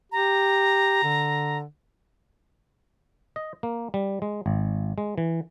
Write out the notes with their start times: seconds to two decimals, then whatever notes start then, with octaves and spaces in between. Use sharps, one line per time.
0.12 G4 A#5
1.03 D3
3.36 D#5
3.63 A#3
3.94 G3
4.22 G#3
4.46 G#1
4.98 G#3
5.18 E3